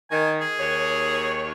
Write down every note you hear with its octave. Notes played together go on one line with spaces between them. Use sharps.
D#3 G#5
G#4
D#2 C#5